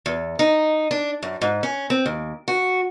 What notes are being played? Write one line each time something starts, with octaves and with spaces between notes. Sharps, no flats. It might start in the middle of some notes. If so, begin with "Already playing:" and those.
E2
D#4
D4
F#2
G#2
C#4
C4
D#2
F#4